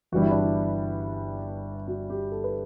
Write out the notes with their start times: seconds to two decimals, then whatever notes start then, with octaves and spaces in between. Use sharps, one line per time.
0.12 G1 G2 E3 G3 F#4
0.22 E4
0.31 D4
0.41 E4
1.88 F#4
2.10 G4
2.32 A4
2.44 B4